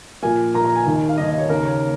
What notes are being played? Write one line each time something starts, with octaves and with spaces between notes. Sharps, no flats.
A#2 F3 A#3 G#5
A#2 F3 A#3 A#5
A#5
G#5
D#2 D#3 A#3
F5
D#2 D#3 A#3 D#5
D#5
C#5
D#2 C#3 A#3 A#4
C#5